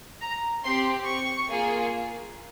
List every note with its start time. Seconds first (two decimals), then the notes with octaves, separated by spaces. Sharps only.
0.21 A#5
0.64 C4 G4 C6
1.07 C#6
1.49 A#3 F4 G#4